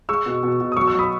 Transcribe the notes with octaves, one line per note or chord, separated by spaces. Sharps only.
G#3 C#6 E6
B2
B2
B2
D#6
F#3 C#6 E6
C#6 E6
F#3 B5 D#6